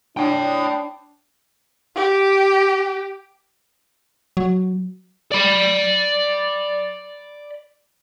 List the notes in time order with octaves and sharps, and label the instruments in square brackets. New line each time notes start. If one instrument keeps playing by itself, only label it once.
[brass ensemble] D4 [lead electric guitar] C#5 G5
[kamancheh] G4
[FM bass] F#3
[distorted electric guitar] D5 B5